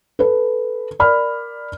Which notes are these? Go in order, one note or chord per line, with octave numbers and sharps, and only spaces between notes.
A4 B4
A#4 D5 B5 F6